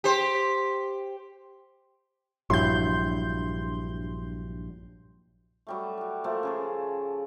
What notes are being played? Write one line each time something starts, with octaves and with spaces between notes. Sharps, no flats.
G4 C5
A#1 G2 F#3 E4 C6 G6
F#3 G3 A3
G3 F#4
F3 A3 A#3 A#4
C#3 G#4 A4